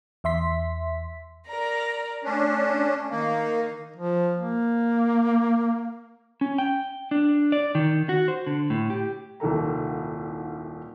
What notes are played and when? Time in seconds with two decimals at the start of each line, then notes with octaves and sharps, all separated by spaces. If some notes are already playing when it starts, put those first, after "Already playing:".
0.24 E2 E5 C6 B6
1.47 A#4 D5 A#5
2.24 A3 C#4 D4
3.10 D#3 A#3 D#4
3.96 F3
4.37 A#3
6.41 C#4
6.58 G5
7.11 D4
7.52 D5
7.75 D#3
8.09 F#4
8.28 C5
8.47 D3
8.70 A2
8.90 G4
9.40 D#1 C2 D#3 A4 A#5